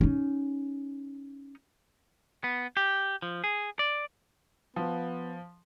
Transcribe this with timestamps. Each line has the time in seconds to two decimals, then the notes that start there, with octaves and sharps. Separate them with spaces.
0.01 C#4 D#4
2.44 B3
2.77 G4
3.22 F3
3.44 G#4
3.79 D5
4.76 F3 B3